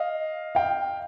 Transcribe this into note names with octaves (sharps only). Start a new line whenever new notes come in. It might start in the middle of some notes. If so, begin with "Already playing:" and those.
Already playing: D#5 F5
F5 G5